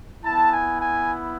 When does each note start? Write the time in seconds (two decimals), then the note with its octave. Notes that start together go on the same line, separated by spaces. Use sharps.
0.23 B3 E4 A5
0.52 G#5
0.81 G#5